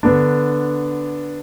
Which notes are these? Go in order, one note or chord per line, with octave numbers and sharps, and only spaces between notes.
D3 B3 D4